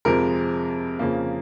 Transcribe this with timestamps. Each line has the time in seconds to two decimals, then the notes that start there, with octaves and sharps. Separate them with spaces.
0.05 F2 C3 F3 G#3 A#4
0.99 F2 C#3 F3 A#3